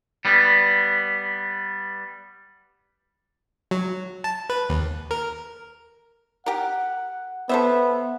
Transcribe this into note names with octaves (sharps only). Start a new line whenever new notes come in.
G3 B3
F#3
A5
B4
D#2
A#4
G4 A#4 F#5
B3 A4 C5 E5